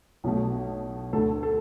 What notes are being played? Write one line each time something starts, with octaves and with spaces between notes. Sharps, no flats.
B1 B2 A3
D2 D3 A3 A4
A4